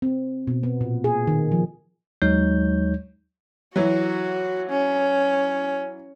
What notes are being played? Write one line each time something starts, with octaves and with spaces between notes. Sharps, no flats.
C4
B2
B3
A#2
G#4
D#3
F3
D#2 F#3 G#3 D#4 C#5 G6
E3 F#3 F#4
C#4